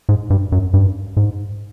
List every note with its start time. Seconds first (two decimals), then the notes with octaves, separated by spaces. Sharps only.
0.09 G#2
0.30 G2
0.52 F#2
0.74 G2
1.17 G#2